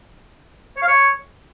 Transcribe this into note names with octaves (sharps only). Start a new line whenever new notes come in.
C#5
F5
C#5